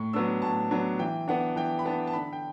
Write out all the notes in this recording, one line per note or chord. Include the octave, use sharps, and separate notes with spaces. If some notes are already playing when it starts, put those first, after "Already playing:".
Already playing: A2 C#6
F#3 B3 D4 E6
A2 A5
F#3 B3 D4
E3 G5
B3 D4 F#5
E3 G5
B5
B3 D4 A5
A5
D3 B5
G5